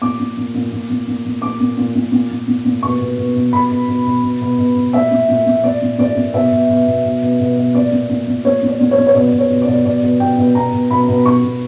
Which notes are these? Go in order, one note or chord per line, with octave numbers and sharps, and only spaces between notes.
A#2 D6
A#2
A#2
A#2
A#2
A#2
A#2
A#2
A#2 D6
A#2
A#2
A#2
A#2
A#2
A#2
A#2
B2 C#6
B2
B2
B2
B2 B5
B2
B2
B2
B2
B2
B2
B2
A#2 E5
A#2
A#2
A#2
A#2 D5
A#2
A#2 D5
A#2
B2 E5
B2
B2
B2
B2
B2
B2
B2
A#2 D5
A#2
A#2
A#2
A#2 C#5
A#2
D5
A#2
C#5
A#2
C#5
B2 D5
B2
C#5
B2
D5
B2
B2 D5
B2
B2 G5
B2
B2 A#5
B2
B2 B5
B2
B2 C#6
B2